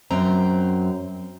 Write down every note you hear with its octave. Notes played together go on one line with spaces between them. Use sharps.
F#2 C4 A#5